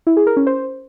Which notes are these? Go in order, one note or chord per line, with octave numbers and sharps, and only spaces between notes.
E4
G#4
A#4
C#4
C5